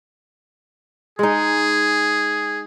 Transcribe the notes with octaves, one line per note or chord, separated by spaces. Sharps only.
G#3 D#4 G#4